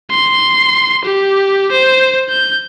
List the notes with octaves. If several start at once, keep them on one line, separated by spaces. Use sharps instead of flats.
C6
G4
C5
G6